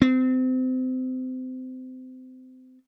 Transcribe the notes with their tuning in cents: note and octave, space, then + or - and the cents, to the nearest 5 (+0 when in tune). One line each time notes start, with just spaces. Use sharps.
C4 -30